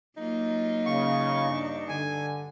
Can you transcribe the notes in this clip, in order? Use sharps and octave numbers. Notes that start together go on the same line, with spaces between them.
F#3 A#3 D#4 F4
C#3 F5 C#6
G2 D4
D3 G#5